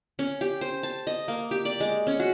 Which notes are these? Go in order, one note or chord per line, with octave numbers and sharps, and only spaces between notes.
C#4
G4
C5
A5
D#5
A#3
G4
D5
G#3
C#4
F#4